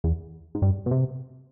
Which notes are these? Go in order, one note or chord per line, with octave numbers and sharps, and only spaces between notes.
E2
G#2
G2
B2
C3